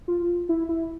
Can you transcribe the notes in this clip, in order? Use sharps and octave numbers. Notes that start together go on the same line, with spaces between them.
F4
E4
E4